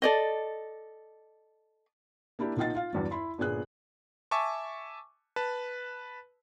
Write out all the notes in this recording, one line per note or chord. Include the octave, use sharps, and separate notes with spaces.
A4 D5 D#5
A#3 D4 E4 G4
B1 A#3 F4 D#5 F#5 A6
F4 F5
E2 G2 F#3
E4 B5 C6
G1 A#2 B3 G#4 F#6
E5 G#5 A5 C#6 D6
B4 A5